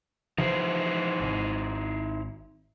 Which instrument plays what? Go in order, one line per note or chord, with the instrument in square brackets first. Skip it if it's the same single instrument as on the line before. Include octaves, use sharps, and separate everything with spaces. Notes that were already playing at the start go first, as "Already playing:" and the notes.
[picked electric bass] C3 E3 F3 [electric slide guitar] D#4 E4 C5
[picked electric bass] G#1